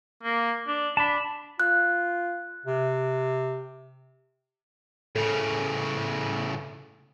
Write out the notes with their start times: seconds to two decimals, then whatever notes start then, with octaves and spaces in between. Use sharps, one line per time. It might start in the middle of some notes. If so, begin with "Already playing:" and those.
0.23 A#3
0.67 D4
0.97 D4 A5 B5
1.60 F4 F#6
2.66 C3
5.16 A2 C#3 A4